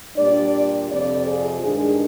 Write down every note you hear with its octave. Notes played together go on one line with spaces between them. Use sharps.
A#2 G3 D4 D5
F2 C3 F3 D5
G#4
G2 D#3 G#3 D4 G#4